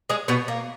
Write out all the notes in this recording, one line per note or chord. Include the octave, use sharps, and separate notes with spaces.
G#3 G#4
B2 B3
A#3